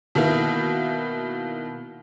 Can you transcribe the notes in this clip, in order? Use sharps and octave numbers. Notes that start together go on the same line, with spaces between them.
B2 D#3 A#3 E4